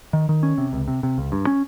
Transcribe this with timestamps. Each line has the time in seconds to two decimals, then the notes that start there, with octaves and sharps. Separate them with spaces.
0.13 D#3
0.29 D#3
0.43 C#4
0.58 C3
0.73 C#2
0.88 C3
1.03 C3
1.18 C#2
1.32 G2
1.47 C#4